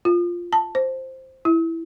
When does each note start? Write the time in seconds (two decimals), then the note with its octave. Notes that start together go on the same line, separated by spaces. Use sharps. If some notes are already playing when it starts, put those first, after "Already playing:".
0.05 F4
0.53 A5
0.75 C5
1.45 E4